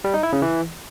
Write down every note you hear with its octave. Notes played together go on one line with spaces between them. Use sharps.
G3
D#4
E4
C#3
E3